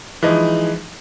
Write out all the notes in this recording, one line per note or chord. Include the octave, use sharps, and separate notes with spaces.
E3 F3 G#3 D#4